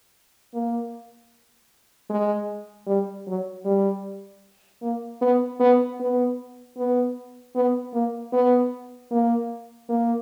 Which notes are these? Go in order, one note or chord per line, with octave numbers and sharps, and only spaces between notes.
A#3
G#3
G3
F#3
G3
A#3
B3
B3
B3
B3
B3
A#3
B3
A#3
A#3